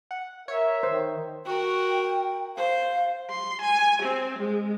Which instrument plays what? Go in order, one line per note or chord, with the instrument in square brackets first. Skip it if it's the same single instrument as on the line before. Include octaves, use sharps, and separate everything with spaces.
[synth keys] F#5
[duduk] A#4 [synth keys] C#5 [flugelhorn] E5
[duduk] D#3 [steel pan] C5
[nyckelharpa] F#4 A#4 [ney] G5
[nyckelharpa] C5 [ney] F5
[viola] C6
G#5
C4
G#3